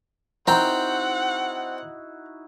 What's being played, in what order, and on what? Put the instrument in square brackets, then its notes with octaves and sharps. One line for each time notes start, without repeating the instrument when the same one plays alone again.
[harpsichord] C4 G5 [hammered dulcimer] D#4 E4 F#4 [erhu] F#5 [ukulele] A#5